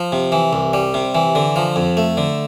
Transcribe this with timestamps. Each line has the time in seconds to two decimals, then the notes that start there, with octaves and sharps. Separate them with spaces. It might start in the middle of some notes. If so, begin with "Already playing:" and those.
Already playing: F3
0.12 C3
0.32 E3
0.53 C2
0.73 G3
0.94 C3
1.15 E3
1.35 D3
1.56 F3
1.76 F2
1.97 A3
2.17 D3